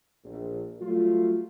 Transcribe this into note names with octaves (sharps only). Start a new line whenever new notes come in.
A#1
F#3 G3 A3 F4